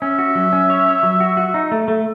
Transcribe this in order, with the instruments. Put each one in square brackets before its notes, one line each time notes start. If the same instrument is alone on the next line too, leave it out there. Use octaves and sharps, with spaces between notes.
[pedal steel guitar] C#4 [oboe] E5
[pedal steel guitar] F#4
F#3
C#4
C#5
C#5
F#3
F#4
F#4
D#4
A3
A3